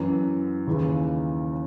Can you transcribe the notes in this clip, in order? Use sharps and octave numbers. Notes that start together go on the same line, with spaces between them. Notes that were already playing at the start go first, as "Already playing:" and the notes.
Already playing: F#2 E3
D#2 C#3 E3